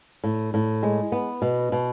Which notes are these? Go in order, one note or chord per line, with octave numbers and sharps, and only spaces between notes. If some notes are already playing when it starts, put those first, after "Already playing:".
A2
A2
G#3
B3
B2
B2